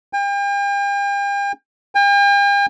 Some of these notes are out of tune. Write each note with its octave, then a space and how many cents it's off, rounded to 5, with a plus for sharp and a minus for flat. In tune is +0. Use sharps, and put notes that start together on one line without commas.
G5 +40
G5 +45